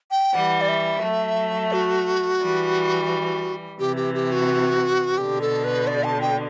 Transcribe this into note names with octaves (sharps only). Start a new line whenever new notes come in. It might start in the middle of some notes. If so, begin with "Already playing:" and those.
G5
E3 G3 F#5
D5
E5
F#3 A3
F#4
E3 G3
C3 E3 G4
G4
G4
F#4
B2 D3 G4
A4
B4
D5
A5
G5